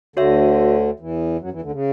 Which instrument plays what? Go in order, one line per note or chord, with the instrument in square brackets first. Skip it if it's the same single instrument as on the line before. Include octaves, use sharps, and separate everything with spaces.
[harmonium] D2 D3 [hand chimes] F#4 C#5 E5
[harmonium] E2 E3
F#2 F#3
E2 E3
D2 D3
C#3